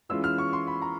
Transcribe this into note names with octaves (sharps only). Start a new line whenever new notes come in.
E3 G#3 C#4 F4 E6
F6
C#6
C6
B5
A#5